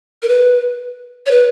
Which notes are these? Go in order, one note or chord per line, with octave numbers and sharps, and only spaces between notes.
A#4
B4
C#5
B4